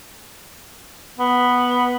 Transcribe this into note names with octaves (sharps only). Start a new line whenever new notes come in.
B3